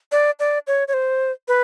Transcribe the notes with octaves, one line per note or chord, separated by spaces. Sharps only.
D5
D5
C#5
C#5
C5
B4